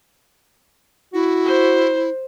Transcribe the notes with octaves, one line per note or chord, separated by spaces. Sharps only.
E4 F#4
C5